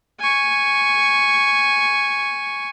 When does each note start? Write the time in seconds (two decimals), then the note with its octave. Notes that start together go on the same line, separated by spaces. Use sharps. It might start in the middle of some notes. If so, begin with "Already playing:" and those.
0.20 G#5 C#6